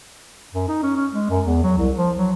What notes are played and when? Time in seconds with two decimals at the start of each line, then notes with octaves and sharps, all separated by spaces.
0.54 F#2
0.68 D#4
0.83 C#4
0.96 C#4
1.12 G#3
1.30 F#2
1.45 E2
1.63 F#3
1.78 C2
1.97 F3
2.17 F#3